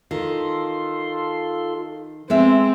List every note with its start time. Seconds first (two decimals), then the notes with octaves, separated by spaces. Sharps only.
0.11 D#3 F4 A4 C6
2.30 G#3 B3 C4 E5